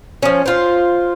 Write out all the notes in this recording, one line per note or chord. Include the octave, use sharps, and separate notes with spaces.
F3 C#4
F4 C5